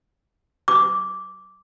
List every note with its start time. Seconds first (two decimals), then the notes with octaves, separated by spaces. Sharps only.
0.68 D6